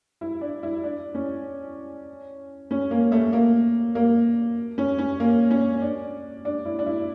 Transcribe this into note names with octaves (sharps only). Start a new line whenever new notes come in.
E4
D4
E4
D4
C#4
C#4
A#3
A3
A#3
A#3
C#4
C#4
A#3
C#4
D4
D4
E4
D4
E4